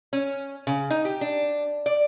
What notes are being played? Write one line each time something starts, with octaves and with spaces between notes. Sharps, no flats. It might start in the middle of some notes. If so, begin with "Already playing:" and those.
C#4
C#3
D#4
G4
D4
D5